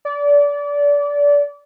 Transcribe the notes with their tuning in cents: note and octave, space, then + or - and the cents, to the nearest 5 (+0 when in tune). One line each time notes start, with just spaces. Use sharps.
D5 -25